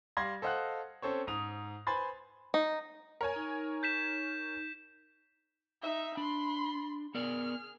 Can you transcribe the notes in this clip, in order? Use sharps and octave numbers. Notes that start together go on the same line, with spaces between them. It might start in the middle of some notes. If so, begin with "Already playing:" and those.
G3 D5 F5 C6 G#6 A#6
A4 C5 D#5 F5 F#5 F#6
C4 C#4 A4 C5 C#5
G#2 D#6 F7
B4 C5 G#5 B5 C6 A6
D#4
A#4 C#5 G#5
D#4
G6 B6 E7
D#4 E5
D4 B5 C6
B3 G#4 A#4 D5 F6